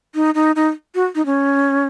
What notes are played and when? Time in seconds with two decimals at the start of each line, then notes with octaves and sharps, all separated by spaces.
0.15 D#4
0.35 D#4
0.56 D#4
0.95 F#4
1.15 D#4
1.26 C#4